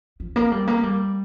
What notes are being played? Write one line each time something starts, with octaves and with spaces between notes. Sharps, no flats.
F3
A#3
G3
A#3
G3